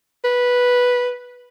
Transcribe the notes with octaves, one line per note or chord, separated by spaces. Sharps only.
B4